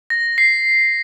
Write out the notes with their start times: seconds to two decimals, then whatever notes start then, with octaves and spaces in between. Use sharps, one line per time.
0.10 A#6
0.38 C7